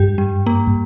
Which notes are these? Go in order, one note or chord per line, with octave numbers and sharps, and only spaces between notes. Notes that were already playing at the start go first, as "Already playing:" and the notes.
Already playing: G2 G4
G3
A#3